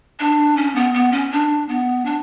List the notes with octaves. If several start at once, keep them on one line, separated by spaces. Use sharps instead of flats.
D4
C#4
B3
B3
C#4
D4
B3
D4